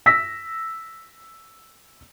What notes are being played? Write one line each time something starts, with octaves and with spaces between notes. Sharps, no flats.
E6 A#6 B6